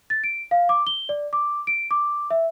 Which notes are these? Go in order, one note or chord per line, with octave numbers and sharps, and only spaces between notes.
A6
D7
F5
D6
G7
D5
D6
D7
D6
E5